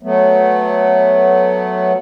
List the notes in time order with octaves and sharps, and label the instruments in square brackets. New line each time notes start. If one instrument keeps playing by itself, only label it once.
[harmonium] F#3 A3 B3